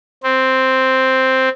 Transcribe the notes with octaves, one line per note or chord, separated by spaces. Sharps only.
C4